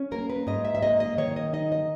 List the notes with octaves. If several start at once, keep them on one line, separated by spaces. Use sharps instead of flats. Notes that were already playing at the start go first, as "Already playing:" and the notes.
Already playing: C#4
A#3 A#4
B4
G#2 D#5
E5
E5
A#3 D#5
D#5
D#3 C#5
D#5
D#4 D#5
D#5